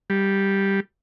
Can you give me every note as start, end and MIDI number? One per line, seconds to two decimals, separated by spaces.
0.10 0.80 55